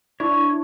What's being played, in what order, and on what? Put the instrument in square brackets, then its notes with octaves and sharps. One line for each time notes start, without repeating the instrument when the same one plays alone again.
[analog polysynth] D4 E4 [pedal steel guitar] C#5